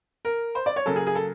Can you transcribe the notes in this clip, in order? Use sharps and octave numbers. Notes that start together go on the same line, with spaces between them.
A#4
C5
D5
C#5
C#3 F#3 A#3 A4
G#4
G#4
A4